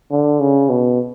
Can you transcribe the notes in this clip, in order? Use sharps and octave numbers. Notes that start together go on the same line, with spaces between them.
D3
C#3
B2